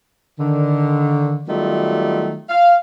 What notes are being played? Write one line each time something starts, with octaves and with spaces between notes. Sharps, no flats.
D3 D#3
D#3 F#3 G3 A3 B3 F4
F5